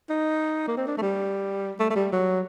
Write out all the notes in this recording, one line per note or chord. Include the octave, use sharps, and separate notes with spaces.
D#4
A#3
C4
D4
A3
G3
A3
A3
G3
F#3